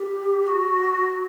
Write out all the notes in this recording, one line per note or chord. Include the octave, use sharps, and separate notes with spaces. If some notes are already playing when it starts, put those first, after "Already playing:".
Already playing: G4
F#4